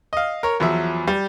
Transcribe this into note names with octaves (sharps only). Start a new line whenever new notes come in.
D#5 F5
A#4 C#5
E2 F3 F#3 E5
G3